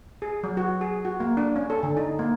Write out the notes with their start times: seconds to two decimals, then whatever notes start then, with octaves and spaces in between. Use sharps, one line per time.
0.22 G#4
0.43 F#3
0.57 F#4
0.81 G#4
1.05 F#4
1.20 A#3
1.37 D4
1.56 C#4
1.70 A4
1.83 D3
1.97 D#4
2.19 A#3